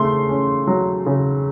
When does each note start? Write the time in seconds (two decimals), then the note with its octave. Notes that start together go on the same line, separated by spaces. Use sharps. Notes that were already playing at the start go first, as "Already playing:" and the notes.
Already playing: C#3 A3 C6
0.29 C#4
0.67 F#3
1.06 C#3